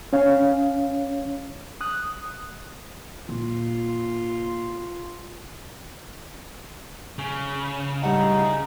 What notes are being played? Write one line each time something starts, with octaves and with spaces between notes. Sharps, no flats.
C#4 C#5 F5
D#6 F#6
A#2 F4
C#3
A2 G3 D#4 F#5